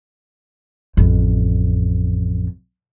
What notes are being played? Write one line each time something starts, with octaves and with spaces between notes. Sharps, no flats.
A1 F2